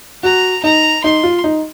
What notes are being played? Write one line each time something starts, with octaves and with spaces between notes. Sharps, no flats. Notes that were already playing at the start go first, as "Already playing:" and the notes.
F#4 A#5
D#4 A#5
D#4 C6
F4
D#4